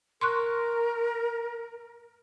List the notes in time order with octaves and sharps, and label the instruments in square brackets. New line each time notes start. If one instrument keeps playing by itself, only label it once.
[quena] A#4 [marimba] C6 C#6 F#6